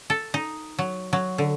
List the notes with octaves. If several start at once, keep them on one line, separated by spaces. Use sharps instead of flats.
A4
D#4
F#3
F#3
D3